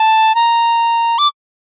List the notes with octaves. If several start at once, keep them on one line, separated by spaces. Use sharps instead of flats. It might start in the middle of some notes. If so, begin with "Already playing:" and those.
Already playing: A5
A#5
D6